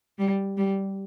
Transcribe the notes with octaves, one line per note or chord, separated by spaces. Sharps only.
G3
G3